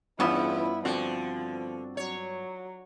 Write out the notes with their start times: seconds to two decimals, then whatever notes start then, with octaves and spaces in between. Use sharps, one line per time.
0.20 E2 G2 B3 C#4 E4 F4 B4
0.85 D3 F3 C4 D4 F#4
1.97 F#3 C#5